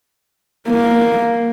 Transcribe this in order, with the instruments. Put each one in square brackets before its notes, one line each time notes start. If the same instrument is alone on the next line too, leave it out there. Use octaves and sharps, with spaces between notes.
[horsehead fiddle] A#3